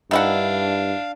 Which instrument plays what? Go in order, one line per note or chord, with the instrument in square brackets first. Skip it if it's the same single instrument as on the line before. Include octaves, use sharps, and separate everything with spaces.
[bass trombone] G2 [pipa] D#3 E4 F#5 [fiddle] D4 [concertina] F5